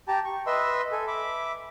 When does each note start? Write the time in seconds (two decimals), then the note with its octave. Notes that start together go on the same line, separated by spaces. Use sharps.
0.08 G4 G5 A5 A#5
0.25 C#6
0.47 B4 D#5 E5 C6 E6
0.92 A4 G#5
1.07 E5 B5 D6